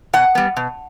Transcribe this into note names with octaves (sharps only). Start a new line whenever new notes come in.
B2 F#5
G3 B3
B2